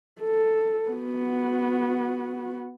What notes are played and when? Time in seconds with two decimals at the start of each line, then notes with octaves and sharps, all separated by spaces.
0.21 A4
0.89 B3 F#4